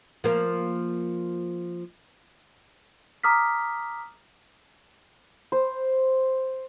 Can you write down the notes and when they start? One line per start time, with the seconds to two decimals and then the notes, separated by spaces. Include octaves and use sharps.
0.24 F3 A#3
3.24 A#5 D6 D#6 F6 B6
5.52 C5